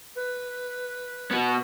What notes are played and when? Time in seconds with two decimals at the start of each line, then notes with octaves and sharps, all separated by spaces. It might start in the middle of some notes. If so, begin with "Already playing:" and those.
0.16 B4
1.31 B3 F#4